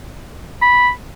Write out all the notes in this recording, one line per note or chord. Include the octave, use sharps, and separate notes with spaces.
B5